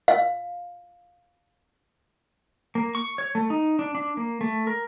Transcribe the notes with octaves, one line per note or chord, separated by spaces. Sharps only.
F5
A#3
C#6
C#5
A3
D#4
D4
D4
A#3
A3
A#4